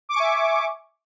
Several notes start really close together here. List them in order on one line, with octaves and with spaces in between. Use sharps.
D6 C#6 G#5 E5